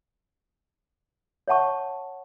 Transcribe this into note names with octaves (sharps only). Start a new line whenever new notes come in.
C#5 E5 F#5 A5 C#6